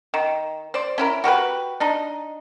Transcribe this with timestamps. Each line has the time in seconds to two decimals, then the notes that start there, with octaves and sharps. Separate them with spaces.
0.14 D#3
0.74 C5 D5
0.98 C#4 E4 A#4
1.24 F#4 G4 A#4 B4
1.80 D4 D#4 D#5